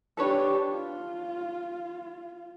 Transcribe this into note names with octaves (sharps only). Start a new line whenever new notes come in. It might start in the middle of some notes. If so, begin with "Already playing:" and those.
D4 G4 A4 B4 C#5
F4